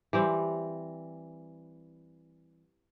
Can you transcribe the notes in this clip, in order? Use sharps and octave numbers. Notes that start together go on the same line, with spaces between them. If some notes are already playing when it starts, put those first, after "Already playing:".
E3 G3 C4